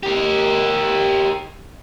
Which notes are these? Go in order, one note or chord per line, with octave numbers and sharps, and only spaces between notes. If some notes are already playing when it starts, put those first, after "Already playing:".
G4 A#4